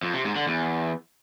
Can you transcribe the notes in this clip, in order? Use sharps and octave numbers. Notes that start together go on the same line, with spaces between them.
F2
C3
G#2
D3
E2